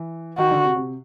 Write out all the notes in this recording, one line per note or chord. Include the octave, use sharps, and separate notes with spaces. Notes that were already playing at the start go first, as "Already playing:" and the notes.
Already playing: E3
D#3 F#4
D3
C3
C3